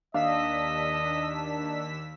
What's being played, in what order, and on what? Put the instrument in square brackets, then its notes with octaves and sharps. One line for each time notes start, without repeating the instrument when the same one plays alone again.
[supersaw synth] D#2 E6 B6 [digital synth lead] D4 [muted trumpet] D#5 [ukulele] F5